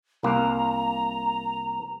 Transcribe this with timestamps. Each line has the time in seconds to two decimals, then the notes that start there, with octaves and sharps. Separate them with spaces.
0.23 C2 A#3 A#5